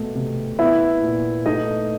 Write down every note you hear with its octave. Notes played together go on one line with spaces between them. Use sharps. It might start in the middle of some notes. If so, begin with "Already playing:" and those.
Already playing: B2 A3
C3
B3 E4 E5
A#2
A3 D#4 D#5